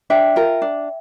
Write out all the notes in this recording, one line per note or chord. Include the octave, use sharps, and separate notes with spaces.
D4 E5 G5
F4 A#4
D4